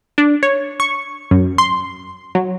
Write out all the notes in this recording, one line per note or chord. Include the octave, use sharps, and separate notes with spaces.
D4
C#5
C#6
F#2
C6
F#3